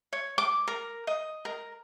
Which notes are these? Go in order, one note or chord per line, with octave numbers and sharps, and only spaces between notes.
C#5
D6
A#4
D#5
A#4